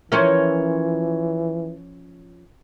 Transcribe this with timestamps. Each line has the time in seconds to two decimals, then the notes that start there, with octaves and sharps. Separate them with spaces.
0.12 E3 F3 C#4 A#4 C#5 E5